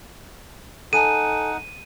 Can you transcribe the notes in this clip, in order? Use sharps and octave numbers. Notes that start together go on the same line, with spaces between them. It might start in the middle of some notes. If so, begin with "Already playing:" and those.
D#4 A4 F#5 G#5 A5 D#7